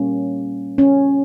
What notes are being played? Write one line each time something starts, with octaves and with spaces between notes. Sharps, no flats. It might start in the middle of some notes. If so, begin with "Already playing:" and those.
Already playing: A#2 G3 A#3 C#4
C#4